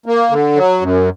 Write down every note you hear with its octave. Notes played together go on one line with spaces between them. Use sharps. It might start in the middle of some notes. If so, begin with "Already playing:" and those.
A#3
D3
F#3
F#2